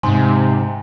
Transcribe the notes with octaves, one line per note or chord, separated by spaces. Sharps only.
G#2 C3 G#5 C6